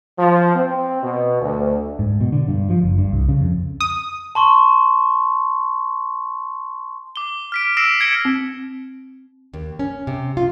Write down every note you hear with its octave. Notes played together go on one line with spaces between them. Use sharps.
F3
C4
B2
D2
G#2
B2
D3
G2
F3
F#1
G2
C2
C#3
F2
D#6
A5 C6 C#6
D6 G7
F6 B6 D7
D6 E6 A#6 C7 D7 E7
G#6 B6 C#7 D7 G7
C4
D#2
C#4
C3
F4